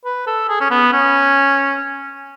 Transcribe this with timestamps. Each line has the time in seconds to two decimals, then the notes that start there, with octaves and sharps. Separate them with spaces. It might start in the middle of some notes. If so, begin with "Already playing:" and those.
0.05 B4
0.27 A4
0.49 G#4
0.60 C#4
0.70 B3
0.92 C#4